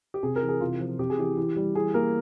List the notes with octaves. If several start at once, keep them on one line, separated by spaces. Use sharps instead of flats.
G4
C3 G#4
A#4
E3
G#4
C3 F4
F3
C3 G4
G#4
E3 G4
E3
G3
E3 G#4
A#3 A#4